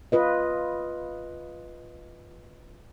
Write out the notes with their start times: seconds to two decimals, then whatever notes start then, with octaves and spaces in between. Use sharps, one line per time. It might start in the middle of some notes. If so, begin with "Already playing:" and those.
0.12 F4 B4 D#5